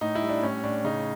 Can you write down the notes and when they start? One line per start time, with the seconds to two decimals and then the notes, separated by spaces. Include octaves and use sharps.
0.01 A2 D#4
0.15 E4
0.21 G3
0.29 D4
0.43 A2 C#4
0.63 A2 D4
0.84 C#3 D#4